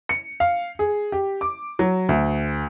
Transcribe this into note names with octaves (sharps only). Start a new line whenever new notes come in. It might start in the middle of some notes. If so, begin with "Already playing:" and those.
C#7
F5
G#4
G4
D6
F#3
D2